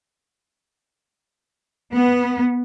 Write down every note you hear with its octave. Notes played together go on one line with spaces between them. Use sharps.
B3